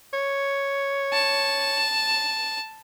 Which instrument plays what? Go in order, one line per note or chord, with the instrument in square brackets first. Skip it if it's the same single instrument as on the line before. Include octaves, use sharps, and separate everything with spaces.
[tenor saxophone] C#5
[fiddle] A5